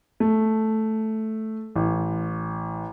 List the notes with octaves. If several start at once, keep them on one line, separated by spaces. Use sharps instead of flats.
A3
A1